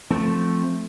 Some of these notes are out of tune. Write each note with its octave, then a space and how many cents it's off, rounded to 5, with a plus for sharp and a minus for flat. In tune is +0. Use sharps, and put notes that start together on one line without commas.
F3 +0 A3 +0 C4 +0